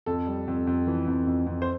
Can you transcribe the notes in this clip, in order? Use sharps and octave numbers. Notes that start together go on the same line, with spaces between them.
F2 A4
G3
F2
F2
E3
F2
F2
F2
C5